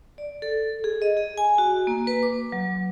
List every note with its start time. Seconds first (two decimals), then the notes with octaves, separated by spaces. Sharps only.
0.18 D5
0.42 A4
0.84 G#4
1.02 D#5
1.17 G#4
1.38 G#5
1.58 F#4
1.87 A#3
2.07 B4
2.23 D6
2.52 F#3